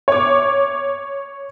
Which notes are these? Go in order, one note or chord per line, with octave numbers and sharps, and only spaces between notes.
C#5 D6